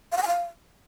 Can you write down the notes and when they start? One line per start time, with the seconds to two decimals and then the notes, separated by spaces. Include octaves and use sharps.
0.12 F5
0.17 F#5
0.22 G#5
0.27 F5